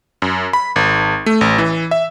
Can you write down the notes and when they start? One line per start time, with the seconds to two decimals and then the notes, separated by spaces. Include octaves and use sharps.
0.22 F#2
0.53 B5
0.76 G#1
1.26 A3
1.41 A1
1.58 E3
1.91 E5